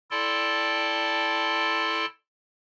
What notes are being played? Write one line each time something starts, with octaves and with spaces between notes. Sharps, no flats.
E4 A4 D5 G5 A5 C6